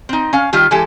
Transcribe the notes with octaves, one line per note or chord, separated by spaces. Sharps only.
C4 D#4
C#4 F5
D#3 G3 F4 G4
E3 G#3 G4 A4